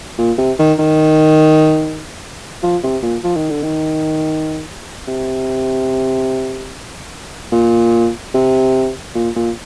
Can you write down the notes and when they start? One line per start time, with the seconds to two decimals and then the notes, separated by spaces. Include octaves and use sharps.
0.18 A#2
0.38 C3
0.59 D#3
0.79 D#3
2.63 F3
2.83 C3
3.03 A#2
3.24 F3
3.36 D#3
3.50 D3
3.63 D#3
5.07 C3
7.52 A#2
8.34 C3
9.15 A#2
9.36 A#2